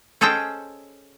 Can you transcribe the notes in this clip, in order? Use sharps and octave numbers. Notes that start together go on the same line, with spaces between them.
C#4 G#4 A4 C5 D#5 G5